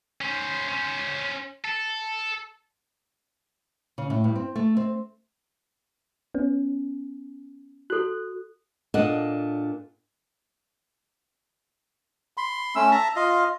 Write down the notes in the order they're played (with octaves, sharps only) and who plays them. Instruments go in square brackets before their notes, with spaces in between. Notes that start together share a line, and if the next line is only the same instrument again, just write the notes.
[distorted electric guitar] C#4 C5
C#4 C5
A4
[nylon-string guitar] C#3
A2
G2
C4
A3
C4
[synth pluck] B3 C#4
[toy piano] F#4 A4 [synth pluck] F#6
[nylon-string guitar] A#2 D4 A4 D#5 F#5
[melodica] B5 C6
A3 C#4 E6
E5 A5 A#5
F4 D#5 F5